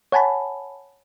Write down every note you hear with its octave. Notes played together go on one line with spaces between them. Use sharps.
C#5 F#5 G#5 A5 B5